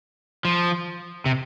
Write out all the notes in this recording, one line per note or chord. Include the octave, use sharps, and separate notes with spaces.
F3
C3